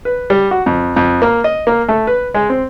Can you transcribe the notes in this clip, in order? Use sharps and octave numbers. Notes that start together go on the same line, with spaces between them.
B4
G3
F#4
F2
F2
A#3
D#5
A#3
A3
B4
G#3
C4